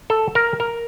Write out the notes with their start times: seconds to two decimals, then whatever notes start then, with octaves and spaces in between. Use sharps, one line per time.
0.10 A4
0.35 A#4
0.60 A#4